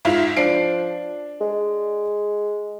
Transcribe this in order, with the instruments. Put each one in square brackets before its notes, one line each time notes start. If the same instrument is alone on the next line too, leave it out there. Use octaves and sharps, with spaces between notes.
[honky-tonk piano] G#2 E4 F4
[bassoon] F3 [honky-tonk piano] D4 C7 D7
[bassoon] G#3